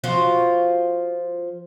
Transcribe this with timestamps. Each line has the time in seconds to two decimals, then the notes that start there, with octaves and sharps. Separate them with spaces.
0.04 F3 F4 F#4